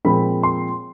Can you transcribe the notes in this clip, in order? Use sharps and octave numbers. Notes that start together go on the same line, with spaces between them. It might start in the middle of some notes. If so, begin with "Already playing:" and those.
A#2 F3 G#3 C4 B5
C6